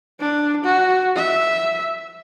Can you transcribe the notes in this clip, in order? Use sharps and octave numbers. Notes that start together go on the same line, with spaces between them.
D4
F#4
E5